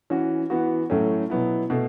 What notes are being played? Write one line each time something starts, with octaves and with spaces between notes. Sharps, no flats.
E3 C#4 F#4
E3 B3 F#4
A2 F#3 A3 C#4
B2 F#3 B3 E4
B2 A3